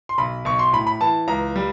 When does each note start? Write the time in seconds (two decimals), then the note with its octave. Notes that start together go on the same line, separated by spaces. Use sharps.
0.09 C6
0.18 B1 B5
0.45 B1 C#6
0.59 C6
0.73 A2 B5
0.87 B5
1.01 E3 A5
1.28 C#2 A#5
1.56 G3